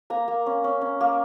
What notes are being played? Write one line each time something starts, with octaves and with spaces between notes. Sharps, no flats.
A#3 A#5
A#3
C#4
C#4
C#4
A#3